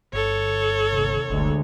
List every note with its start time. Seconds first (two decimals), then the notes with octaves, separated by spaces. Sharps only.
0.13 G1 A4 C#5
0.90 D#2 C3
1.30 G1 D2 D3 G#3